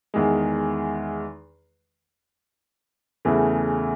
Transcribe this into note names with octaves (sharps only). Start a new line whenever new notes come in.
E2 D#3 G#3
E2 C#3 E3 A3 E4